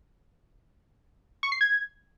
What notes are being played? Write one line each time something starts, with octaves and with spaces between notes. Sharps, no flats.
C#6
C7
G#6